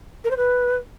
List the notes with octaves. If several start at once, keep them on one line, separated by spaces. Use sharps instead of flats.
A#4
C5
B4